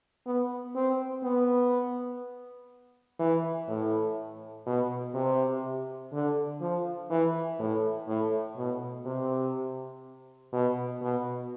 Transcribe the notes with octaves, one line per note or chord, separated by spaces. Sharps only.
B3
C4
B3
E3
A2
B2
C3
D3
F3
E3
A2
A2
B2
C3
B2
B2